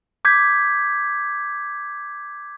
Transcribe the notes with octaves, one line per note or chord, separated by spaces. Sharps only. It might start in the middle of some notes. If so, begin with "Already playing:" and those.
D6 G6 G#6 B6